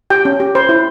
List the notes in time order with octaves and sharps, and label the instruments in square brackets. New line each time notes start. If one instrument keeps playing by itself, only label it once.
[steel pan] G4 G5
C#4
G4
C5
E4